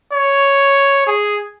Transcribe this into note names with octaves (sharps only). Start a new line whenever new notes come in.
C#5
G#4